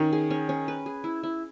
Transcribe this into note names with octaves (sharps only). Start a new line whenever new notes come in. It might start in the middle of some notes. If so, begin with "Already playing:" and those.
Already playing: D#3 C#4
G#4
C#4
C#4
B4
G#4
E4
E4